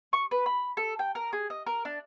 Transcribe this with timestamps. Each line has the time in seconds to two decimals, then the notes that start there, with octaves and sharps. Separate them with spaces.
0.13 C#6
0.31 B4
0.46 B5
0.77 A4
0.99 G5
1.15 A#4
1.33 G#4
1.50 D#5
1.66 A#4
1.85 D4